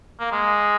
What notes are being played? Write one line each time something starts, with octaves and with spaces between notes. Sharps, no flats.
A#3
G#3